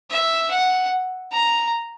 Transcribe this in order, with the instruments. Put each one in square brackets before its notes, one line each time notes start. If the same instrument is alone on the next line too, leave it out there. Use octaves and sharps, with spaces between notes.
[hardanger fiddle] E5
F#5
A#5